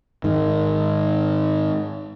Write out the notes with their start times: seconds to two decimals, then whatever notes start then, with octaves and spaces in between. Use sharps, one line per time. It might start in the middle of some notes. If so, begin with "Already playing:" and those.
0.24 G#2 D#3